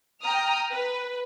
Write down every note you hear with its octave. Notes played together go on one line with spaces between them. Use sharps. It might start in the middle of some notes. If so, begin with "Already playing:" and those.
G5 A#5 D#6 F6
B4